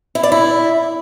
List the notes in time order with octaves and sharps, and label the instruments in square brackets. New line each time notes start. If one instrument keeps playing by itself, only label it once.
[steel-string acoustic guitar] E4
D5
E4